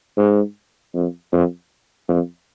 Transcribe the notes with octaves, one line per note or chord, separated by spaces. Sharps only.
G#2
F2
F2
F2